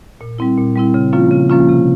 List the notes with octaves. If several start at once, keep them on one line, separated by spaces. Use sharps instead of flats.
A#2
G3 C4 E4
A#2
G3 C4 E4
C#3
F3 A#3 C#4 F4
C#3
F3 A#3 C#4 F4
C3